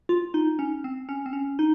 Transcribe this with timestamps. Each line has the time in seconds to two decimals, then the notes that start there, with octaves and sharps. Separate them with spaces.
0.09 F4
0.34 D#4
0.59 C#4
0.84 C4
1.09 C#4
1.26 C4
1.33 C#4
1.59 D#4